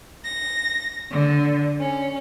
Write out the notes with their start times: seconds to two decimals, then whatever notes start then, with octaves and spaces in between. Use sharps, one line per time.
0.24 A#6
1.11 D3
1.80 C#4